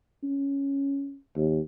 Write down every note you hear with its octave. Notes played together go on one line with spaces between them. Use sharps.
C#4
D#2